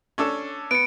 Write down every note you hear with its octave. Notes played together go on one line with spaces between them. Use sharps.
C#4 D4 A4
B3 C#7 D7